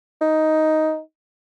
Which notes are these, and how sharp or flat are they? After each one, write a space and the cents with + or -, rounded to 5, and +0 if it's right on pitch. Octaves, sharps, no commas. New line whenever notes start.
D#4 +5